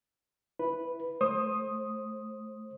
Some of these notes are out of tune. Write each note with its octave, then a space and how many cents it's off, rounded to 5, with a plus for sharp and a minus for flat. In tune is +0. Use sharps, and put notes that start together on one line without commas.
E4 +0 B4 +0
A3 -20 C5 +30 D#6 +0